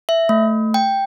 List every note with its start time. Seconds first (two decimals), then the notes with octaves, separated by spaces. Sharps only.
0.09 E5
0.29 A3
0.74 G5